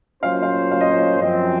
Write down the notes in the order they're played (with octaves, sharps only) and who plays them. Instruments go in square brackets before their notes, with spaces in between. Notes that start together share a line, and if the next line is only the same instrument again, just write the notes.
[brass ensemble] F#3 A#3 C#4 F4 C5 [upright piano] F5
[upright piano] F5
F5
D#5
C#5
D#5
[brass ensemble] F#2 F3 C4 [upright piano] D#5